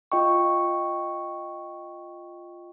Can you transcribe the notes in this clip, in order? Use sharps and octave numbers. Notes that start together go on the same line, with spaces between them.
F4 D#5 G5 C#6